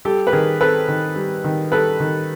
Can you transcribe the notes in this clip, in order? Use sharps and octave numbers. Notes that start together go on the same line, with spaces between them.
G3 G4 A4
B4
D#3 G#4 A#4
C4 A4 B4
D#3
G3
D#3
G3 A4 B4
D#3